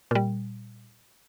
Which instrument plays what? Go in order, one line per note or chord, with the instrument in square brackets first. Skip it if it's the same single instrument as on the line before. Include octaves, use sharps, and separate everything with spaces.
[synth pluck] A#2 G3